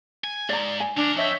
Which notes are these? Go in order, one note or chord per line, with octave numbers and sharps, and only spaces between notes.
G#5
G#2 D5 A#5
G#5
D2 D4 A#4
F2 C#5 D#5 E5 G5